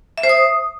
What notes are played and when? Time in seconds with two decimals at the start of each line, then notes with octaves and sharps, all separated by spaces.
0.18 E5
0.23 C5
0.29 D#6